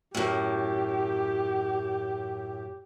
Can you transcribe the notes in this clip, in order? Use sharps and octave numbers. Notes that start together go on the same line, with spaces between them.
F#2 A2 G4